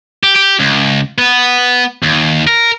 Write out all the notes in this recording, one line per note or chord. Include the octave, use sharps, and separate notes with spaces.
G4
G4
C#2
B3
D#2
A#4